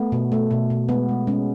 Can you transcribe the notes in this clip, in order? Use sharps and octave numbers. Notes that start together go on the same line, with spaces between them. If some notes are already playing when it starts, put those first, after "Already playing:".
Already playing: A3 B3
B2
A3
B2
B2
G#3 B3
G#3
G#3 C#4